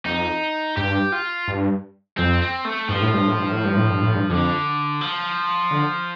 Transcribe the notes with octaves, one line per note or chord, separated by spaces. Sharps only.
F2 D#4
G2 G4
F4
G2
F2 C4
C4
A3
G2 F3
A2
G2
A2
G2
A2
G2
A2
G2
A2
G2
F2 D3
F3
D3